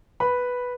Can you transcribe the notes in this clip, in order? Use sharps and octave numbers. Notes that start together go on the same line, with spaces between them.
B4 B5